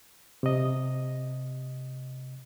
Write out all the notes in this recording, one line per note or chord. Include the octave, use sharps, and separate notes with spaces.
C3 D#5